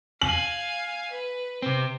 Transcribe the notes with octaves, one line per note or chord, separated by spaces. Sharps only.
F5 G#5 F#7
B4
C3 C4